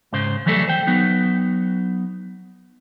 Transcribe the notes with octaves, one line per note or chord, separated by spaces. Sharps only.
G#2 C#3 C5
E3 F#3 G3 A3 A4
C5 G5
F#3 B3 D#4